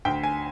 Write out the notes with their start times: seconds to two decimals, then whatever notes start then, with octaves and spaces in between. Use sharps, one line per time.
0.05 D2 G5
0.23 G#5